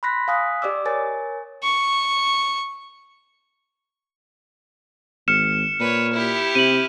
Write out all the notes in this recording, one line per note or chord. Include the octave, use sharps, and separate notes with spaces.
B5 C6 F#6 A#6 B6
F5 G#5 D#6 F#6 B6
G4 D5 D#5 D6 E6
A#4 C#5 G#5 A6
C#6
G#1 F6 C#7 E7
A#2 B4 C#5
E4 G4
C3 D#7 F#7